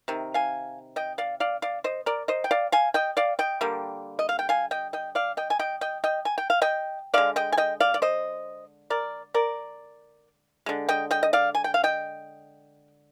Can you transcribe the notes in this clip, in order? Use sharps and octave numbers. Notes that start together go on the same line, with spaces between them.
C3 D#3
F5 G#5
D#5 G5
D5 F5
D5 F5
D5 F5
C5 D#5
A#4 D5
C5 D#5
G5
D5 F5
F5 G#5
D#5 G5
D5 F5
D#5 G5
D3 G3 A#3
D#5
F5
G5
F5 G#5
D#5 G5
D#5 G5
D5 F5
D#5 G5
G#5
D#5 G5
D#5 G5
D#5 G5
G#5
G5
F5
D#5 G5
D3 G#3 D5 F5
D#5 G5
G#5
D#5 G5
D5 F5
D5
C5 D#5
A#4 D5
A#4 D5
D3 G#3
D#5 G5
D#5 G5
D#5
D5 F5
G#5
G5
F5
D#5 G5